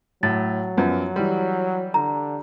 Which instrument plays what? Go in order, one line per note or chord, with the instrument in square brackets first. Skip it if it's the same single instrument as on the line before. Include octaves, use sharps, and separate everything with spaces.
[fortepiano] A2 [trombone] F#3 [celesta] A6
[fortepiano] F#2 F3 B3
E3 G3
[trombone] D3 [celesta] A#5